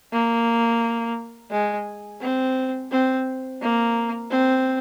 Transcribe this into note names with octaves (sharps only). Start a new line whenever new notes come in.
A#3
G#3
C4
C4
A#3
C4